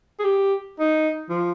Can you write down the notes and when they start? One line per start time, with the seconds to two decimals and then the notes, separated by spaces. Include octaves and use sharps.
0.19 G#4
0.24 G4
0.80 D#4
1.29 F3